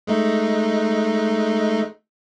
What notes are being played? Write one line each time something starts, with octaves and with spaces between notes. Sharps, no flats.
G#3 A3 D#4